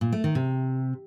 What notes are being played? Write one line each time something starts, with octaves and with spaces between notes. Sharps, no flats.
A#2
A3
D#3
C3